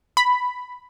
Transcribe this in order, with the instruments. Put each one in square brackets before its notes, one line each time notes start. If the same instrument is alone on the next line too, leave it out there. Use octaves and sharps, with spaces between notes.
[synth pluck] B5